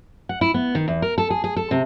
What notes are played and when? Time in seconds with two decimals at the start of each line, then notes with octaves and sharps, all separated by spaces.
0.29 F#5
0.41 E4
0.54 B3
0.75 D#3
0.88 E2
1.02 A#4
1.18 A4
1.30 G#4
1.44 G#4
1.56 A4
1.71 C3